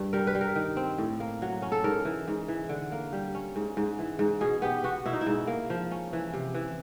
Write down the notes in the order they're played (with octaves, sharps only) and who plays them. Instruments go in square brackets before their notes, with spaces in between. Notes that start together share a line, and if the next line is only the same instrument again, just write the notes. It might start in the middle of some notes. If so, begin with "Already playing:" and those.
Already playing: [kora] G2
G3 A#4
B4
G3
A#4
D#3
C4
A2
A#3
F#3
C#4
A4
G#2 A#4
E3
G#2
E3
D3
A#3
G3
C#4
G#2
G#2
E3
G#2
B2 G#4
B3 G4
B3 F#4
B2 E4
D#4
E4
G#2
A#3
F3
C#4
E3
C3
E3